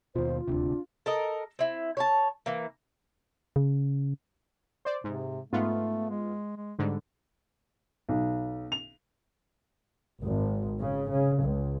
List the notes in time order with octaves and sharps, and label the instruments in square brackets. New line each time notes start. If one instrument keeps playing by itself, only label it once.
[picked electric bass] D#2 B2 [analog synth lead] F4 [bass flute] C5
[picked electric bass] D#1 D2 C3 [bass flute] D4
[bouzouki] A4 A#4 D#5
C4 E4
C#5 G#5 A5
E3 A#3
[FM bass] C#3
[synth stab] C5 D5
[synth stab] G#2 [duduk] C3
[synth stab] G#2 B3 F4 [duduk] A3
[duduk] G#3
G#3
[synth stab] G#2 D3 [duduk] G3
[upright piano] B1
F7
[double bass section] G#1
C#3
C#3
C#2